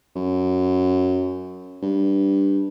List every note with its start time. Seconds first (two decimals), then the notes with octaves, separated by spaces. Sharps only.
0.16 F#2
1.82 G2